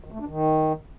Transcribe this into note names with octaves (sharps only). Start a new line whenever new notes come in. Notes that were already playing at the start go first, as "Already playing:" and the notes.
D#3
A3
D4
D#3